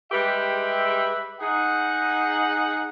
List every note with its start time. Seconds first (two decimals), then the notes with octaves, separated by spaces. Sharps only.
0.12 G3 G#3 G4 B4 E5
1.40 D#4 G#4 F#5